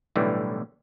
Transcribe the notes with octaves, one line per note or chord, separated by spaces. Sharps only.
B1 A2 D3 E3 G3